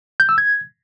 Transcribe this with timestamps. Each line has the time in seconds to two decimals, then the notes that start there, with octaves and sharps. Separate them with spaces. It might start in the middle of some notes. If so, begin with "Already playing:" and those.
0.20 G6
0.29 E6
0.38 G#6